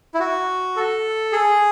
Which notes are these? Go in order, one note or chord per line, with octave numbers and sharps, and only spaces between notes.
E4
F#4
A4
G#4